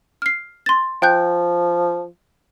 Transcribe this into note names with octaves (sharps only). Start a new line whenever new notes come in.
F6 C7
C6 A6
F3 G5 F#6 G6